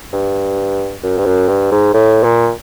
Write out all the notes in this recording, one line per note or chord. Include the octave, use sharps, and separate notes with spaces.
G2
F#2
G2
F#2
G2
G#2
A2
A#2